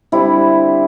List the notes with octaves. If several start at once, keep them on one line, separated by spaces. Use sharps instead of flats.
D3 G3 C4 E4